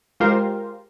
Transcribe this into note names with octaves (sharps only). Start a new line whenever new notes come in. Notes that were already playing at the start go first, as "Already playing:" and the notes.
G#3 F4 G4 A#4 C5